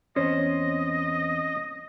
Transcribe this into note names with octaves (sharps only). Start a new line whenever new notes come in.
E2 C4 C#4 C5 D#5